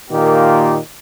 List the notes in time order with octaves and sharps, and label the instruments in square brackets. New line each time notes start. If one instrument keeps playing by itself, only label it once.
[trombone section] A#2 D#3 A#3 F4 G4